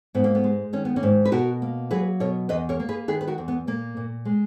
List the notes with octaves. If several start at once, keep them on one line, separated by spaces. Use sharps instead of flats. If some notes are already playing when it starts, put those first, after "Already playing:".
G#2 B3
A#3
B3
G#3
D#3 C#4
B3
A#3 C#4
G#2
B4
B2 F#4 A#4
A#3
F#3 G#4 B4
B2 A#4 C#5
E2 B4 D#5
A#4 C#5
A#3
G#4 B4
D#3 G#4 B4
B4
F#4 A#4
E2
B3
A#2 A#3
A#2
G#3